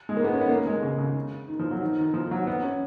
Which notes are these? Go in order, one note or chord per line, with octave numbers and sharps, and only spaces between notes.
G#3
A#3
B3
C#4
B3
A#3
G#3
C#3
C#3
D#3
F3
F#3
D#3
D#3
F3
F#3
B3
C#4